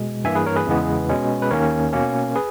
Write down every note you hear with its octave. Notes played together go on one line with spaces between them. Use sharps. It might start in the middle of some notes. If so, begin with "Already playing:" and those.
Already playing: B2 G#3
G2 E3 A#3 E5 G#5
G#4 B4
A#4 C#5
G#4 B4
E2 C#3 E3 G#3 B3
B2 G#3 C#4
B4
D#2 D#3 A#3 C#4 A#4 C#5
B2 A#3 C#4
G#4 B4